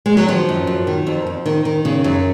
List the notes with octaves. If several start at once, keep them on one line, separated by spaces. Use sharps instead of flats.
G#3
F#3
D#3 F3
F#2
F#2
D#3
F2
F2
D#3
D#3
C#3
F#2